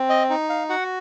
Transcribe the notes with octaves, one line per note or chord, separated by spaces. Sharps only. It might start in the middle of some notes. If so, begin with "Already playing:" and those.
Already playing: C4
D#5
D#4
F5
F#4 F#5